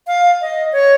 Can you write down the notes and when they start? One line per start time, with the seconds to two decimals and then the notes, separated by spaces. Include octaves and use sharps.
0.07 F5
0.41 D#5
0.72 C#5